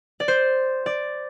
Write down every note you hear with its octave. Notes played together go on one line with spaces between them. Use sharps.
D5
C5
D5